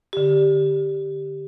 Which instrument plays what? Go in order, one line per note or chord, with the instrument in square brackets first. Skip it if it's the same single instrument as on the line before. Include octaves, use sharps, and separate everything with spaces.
[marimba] D3 G4